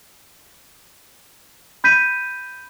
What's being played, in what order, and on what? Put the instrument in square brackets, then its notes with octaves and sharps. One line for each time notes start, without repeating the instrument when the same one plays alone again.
[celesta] B5 G6 B6 D#7